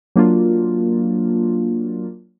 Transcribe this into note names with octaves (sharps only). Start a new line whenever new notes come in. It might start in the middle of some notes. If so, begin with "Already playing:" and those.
F#3 A#3 D4 F4